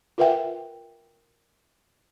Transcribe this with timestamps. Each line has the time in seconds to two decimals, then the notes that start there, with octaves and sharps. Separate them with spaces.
0.18 F4 A#4 B4 E5 F#5 G5